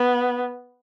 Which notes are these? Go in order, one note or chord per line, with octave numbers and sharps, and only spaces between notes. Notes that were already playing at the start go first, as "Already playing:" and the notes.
Already playing: B3